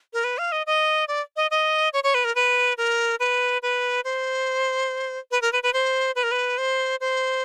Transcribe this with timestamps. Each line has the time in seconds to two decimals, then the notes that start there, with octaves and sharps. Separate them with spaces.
0.14 A#4
0.24 B4
0.38 F5
0.52 D#5
0.67 D#5
1.08 D5
1.36 D#5
1.51 D#5
1.93 C#5
2.04 C#5
2.14 B4
2.25 A#4
2.35 B4
2.77 A#4
3.20 B4
3.62 B4
4.04 C5
5.31 B4
5.42 A#4
5.53 B4
5.63 B4
5.73 C5
6.16 B4
6.23 A#4
6.31 B4
6.58 C5
7.00 C5